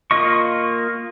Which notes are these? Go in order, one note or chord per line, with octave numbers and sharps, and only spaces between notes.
A#3 F4 D#5 C#6